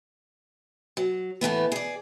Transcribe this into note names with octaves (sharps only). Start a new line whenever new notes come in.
F#3
A2 E3 A3 B3
G#4 D5